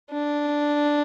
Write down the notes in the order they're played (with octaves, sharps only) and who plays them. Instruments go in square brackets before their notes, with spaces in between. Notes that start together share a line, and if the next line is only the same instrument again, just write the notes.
[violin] D4